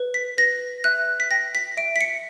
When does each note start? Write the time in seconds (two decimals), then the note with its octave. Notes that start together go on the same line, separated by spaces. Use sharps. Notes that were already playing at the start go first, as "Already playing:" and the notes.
Already playing: B4
0.14 B6
0.38 B4 A#6
0.84 E5 F#6
1.20 B6
1.31 G5 A#6
1.55 B6
1.77 E5 D7
1.96 B6
2.01 C#7